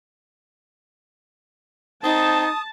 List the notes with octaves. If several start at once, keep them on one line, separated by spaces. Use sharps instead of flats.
C4 D#4 A5 D#6